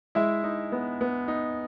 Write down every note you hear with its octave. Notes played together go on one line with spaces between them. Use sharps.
G#3 E4 E5
D#4
B3
B3
D#4